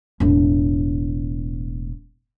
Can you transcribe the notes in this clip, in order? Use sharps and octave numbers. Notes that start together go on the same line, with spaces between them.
E1 A2